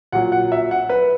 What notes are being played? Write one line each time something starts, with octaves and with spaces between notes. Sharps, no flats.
A#2 F#3 F#5
F#5
E5
F#5
B4